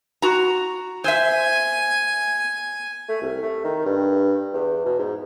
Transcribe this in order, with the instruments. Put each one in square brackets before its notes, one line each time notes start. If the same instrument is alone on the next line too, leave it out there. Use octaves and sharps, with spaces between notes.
[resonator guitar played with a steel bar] F#4 A#5
[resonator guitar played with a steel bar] C5 E5 [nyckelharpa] G#5
[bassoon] A3
C2
A3
D#3
G2
E2
B2
G#2